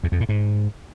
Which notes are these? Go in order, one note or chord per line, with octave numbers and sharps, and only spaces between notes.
E2
F2
A2
G#2